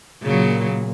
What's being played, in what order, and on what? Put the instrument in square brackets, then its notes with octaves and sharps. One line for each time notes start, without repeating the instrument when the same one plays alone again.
[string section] A#2 [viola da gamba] C#3 F#3